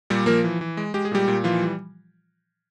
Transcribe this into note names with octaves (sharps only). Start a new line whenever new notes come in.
A#2 G3 G4
F3 A#3 A#4
E3
E3
G#3
G#3 G4
G#4
A#2 G3 G4
A#2
E3 F3 F4
G3